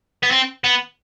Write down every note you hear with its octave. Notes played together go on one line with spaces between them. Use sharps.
B3
C4
B3